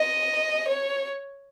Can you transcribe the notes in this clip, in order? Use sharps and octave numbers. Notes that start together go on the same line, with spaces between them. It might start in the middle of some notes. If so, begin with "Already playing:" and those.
Already playing: D#5
C#5